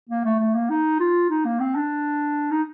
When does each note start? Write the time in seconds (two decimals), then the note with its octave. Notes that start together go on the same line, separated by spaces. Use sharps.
0.09 A#3
0.25 A3
0.40 A3
0.55 A#3
0.70 D#4
1.00 F4
1.30 D#4
1.45 A#3
1.61 C4
1.76 D4
2.51 D#4